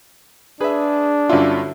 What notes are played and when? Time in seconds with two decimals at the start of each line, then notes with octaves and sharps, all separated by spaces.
0.61 D4 G#4 B4 E5
1.29 G2 D3 F#3 C#4 E4 F4